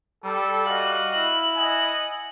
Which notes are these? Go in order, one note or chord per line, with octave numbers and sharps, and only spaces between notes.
G3 A4
F#4 D#5 F5 F#7
E4
D#5 F#5 G#5